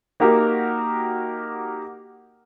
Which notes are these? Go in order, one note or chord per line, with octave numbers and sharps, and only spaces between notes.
A#3 D#4 F#4 G4 A#4